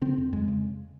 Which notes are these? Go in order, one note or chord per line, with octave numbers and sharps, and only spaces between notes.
C#3 C4
F2
F2 G#3
C#3